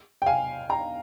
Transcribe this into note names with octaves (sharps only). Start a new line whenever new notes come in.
G5
F5 G#5
G5 A#5